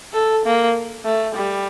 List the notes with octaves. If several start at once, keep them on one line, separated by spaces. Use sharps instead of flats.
A4
A#3
A3
G3